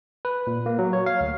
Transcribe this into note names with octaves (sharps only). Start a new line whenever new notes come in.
B4
A#2
A#3
F#3
C#5
F5
D2